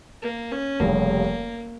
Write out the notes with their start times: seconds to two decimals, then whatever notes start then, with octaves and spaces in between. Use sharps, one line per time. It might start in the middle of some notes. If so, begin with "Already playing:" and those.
0.22 A#3
0.52 C#4
0.80 F1 F2 C#3 G3 A#3